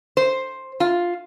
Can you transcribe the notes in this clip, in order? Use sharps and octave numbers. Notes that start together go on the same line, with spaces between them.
C5
F4